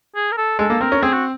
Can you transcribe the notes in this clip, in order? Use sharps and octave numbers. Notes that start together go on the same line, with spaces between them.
G#4
A#4
A4
G#3 A4
A#3
C4 A#4
C#4
C4 G#4
F#4